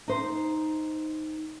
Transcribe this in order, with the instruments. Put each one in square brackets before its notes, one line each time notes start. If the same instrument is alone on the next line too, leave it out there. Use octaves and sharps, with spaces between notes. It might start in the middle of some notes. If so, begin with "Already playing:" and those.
[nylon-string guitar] D#4 C5